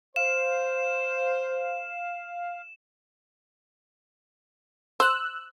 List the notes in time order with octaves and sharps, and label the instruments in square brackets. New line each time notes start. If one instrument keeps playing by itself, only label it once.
[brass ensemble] C5 [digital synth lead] F5 [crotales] E7
[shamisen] C5 [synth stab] E6 F#6